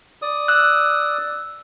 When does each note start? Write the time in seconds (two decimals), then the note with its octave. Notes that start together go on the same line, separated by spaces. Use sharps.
0.22 D5 D#6
0.48 E6 F#6